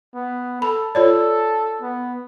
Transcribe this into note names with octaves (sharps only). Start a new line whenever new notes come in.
B3
A4 B5
F4 A4 C#5 D5
B3